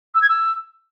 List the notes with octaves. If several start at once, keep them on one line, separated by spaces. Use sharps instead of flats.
E6
G#6
E6